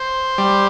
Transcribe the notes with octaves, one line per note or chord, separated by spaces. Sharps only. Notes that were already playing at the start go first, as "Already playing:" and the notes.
Already playing: C5
G3